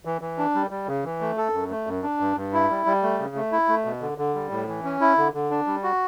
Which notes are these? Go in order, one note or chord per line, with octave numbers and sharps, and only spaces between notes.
E3
E3
D4
G3
G3
C#3
E3
A3
A4
F#2
A3
F#2
D4
G2
G2
E4
G3
G3
A3
C#3
A3
E4
A3
B2
D3
D3
G3
A2
E3
C#4
E4
D3
D3
D4
G3
F#4